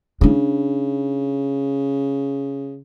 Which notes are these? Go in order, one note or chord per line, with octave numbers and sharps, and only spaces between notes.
C#3 D4 E4